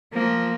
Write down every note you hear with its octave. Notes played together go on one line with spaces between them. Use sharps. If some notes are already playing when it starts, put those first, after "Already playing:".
F3 A#3